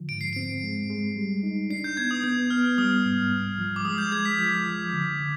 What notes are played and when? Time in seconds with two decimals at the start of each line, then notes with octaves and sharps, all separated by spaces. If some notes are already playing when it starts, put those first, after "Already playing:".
Already playing: D3 F3
0.09 G#2 D7
0.21 C7
0.33 C4 D7
0.63 G#3
0.90 G#3
1.16 G3
1.43 D#4
1.70 D4 C7
1.84 G6
1.97 B3 G#6
2.11 D#6
2.24 B3 G6
2.50 B3 F6
2.78 G3 D#6
3.05 G#2
3.32 C2
3.58 F3
3.76 D6
3.85 G#3 D#6
3.98 G6
4.12 G#3 G#6
4.25 B6
4.38 F3 B6
4.66 F3
4.93 D3
5.20 D3